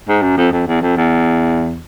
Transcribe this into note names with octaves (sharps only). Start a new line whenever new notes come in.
G#2
F#2
F2
F2
E2
F2
E2